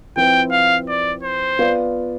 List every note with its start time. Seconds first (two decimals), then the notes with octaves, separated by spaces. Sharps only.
0.16 F3 C4 E4 B4 G5
0.52 F5
0.88 D5
1.23 C5
1.59 B3 F4 B4 D5 F5